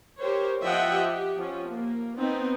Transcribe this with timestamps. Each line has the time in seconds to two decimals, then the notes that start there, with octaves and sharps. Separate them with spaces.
0.18 G4 A#4 C5 C#5
0.61 F3 F4 D#5 E5 F#5 G5
0.93 G4
1.37 F3 C#4
1.70 A#3
2.18 B3 C4 D#4